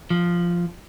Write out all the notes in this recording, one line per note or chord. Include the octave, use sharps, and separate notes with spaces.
F3